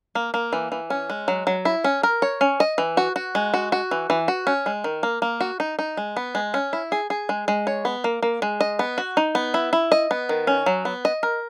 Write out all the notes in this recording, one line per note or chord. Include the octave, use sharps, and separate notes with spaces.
A#3
A#3
E3
E3
C#4
G#3
F#3
F#3
E4
C#4
A#4
C#5
C#4
D#5
E3
F#4
F#4
G#3
F#4
F#4
E3
E3
F#4
C#4
G#3
D#3
A#3
A#3
F#4
D#4
D#4
G#3
B3
G#3
C#4
E4
G#4
G#4
G#3
G#3
C#5
B3
A#3
A#3
G#3
D#5
B3
F#4
D#4
B3
E4
E4
D#5
B3
D#3
C#4
F#3
B3
D#5
A#4